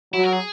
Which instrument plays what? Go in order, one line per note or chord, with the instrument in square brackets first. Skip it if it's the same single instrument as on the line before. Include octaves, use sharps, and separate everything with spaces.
[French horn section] F#3 [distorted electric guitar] E4
[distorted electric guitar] A#4
G#4